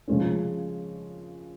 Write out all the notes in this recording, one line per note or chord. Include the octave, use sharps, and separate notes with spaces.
C#3 F3 G#3 C#4